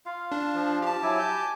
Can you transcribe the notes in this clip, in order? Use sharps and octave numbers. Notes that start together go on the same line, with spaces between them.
F4 F5
D4
F3
G4 A5
F#3 E4 G#5 D6
G6